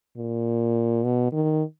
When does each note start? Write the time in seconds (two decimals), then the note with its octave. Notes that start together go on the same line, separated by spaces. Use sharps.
0.17 A#2
1.04 B2
1.32 D#3